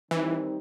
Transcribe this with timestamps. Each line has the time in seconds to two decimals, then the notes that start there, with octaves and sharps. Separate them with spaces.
0.11 D#3 E3 G3 C4 D#4